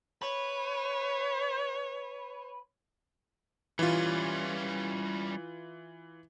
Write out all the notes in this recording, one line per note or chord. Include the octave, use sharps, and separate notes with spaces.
B4 C#5
E3 G3 C#4 F4